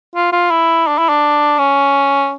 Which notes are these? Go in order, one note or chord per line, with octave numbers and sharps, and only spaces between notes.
F4
F4
E4
D4
E4
D4
C#4